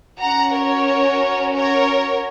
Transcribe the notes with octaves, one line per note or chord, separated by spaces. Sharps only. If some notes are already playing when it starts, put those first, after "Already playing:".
C#4 F#4 F#5 A#5
A#4 C#5
A#4 C#5